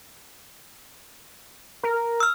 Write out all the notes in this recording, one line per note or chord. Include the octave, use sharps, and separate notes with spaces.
A#4
E6 F6